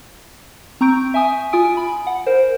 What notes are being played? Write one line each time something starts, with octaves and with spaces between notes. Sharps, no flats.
C4 A#5 C#6 G6 D7
E5 G#5 D#6
F4 G#5 D#6 D7
B5
F#5
A#4 C5